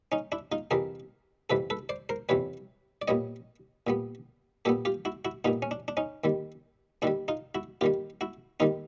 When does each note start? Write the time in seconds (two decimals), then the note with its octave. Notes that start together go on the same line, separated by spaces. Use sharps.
0.12 C#4 D#4
0.32 D4 E4
0.52 D#4 F4
0.71 F2 C3 E3 G3 G#4 A#4
1.50 F2 C3 E3 G3 A4 B4
1.70 A4 B4
1.89 C5 D5
2.09 A#4 C5
2.29 F2 C3 E3 G3 B4 C#5
3.02 D5
3.08 A#2 G3 B3 C#5 D#5
3.87 A#2 G3 B3
4.65 A#2 G3 B3 G4 A4
4.85 F4 G4
5.05 E4 F#4
5.25 E4 F#4
5.45 A#2 G3 B3 D#4 F4
5.62 C#4
5.71 D4
5.88 D4
5.97 C#4 D#4
6.24 D#2 D#3 G3
7.02 D#2 D#3 G3 D4 E4
7.28 D#4 F4
7.55 E4 F#4
7.81 D#2 D#3 G3 F4 G4
8.21 E4 F#4
8.60 D#2 D#3 G3 D#4 F4